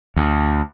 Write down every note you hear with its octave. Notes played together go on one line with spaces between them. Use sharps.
D2